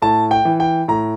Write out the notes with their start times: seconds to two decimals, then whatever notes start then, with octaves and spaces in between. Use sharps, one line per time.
0.02 A2 A5
0.31 G5
0.45 E3
0.60 G5
0.88 A2 A#5